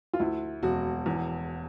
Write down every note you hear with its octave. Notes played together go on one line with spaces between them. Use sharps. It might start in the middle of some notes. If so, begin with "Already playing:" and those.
F4
D2 E4
E1 F#4
E2